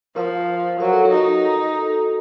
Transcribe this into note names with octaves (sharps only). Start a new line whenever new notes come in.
F3 A#4
F#3 A#4
A4
F#4
D#4
A4